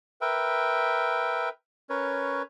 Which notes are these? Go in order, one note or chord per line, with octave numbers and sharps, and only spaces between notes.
A#4 B4 E5 G5
C#4 A#4 B4 C#5